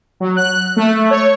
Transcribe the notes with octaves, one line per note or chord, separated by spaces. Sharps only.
F#3
F#6
A3
C#5